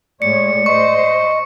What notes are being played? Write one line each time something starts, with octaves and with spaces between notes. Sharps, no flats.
A2 G#3 C#5 D5 C#7
C5 D#5 C#6